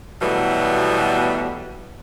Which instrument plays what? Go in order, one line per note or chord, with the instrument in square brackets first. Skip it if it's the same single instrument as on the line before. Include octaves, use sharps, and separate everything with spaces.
[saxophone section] B2 E3 F#3 G3 A3 B3